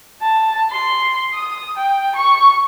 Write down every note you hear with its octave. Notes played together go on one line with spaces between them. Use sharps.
A5
C6
D#6
G5
C#6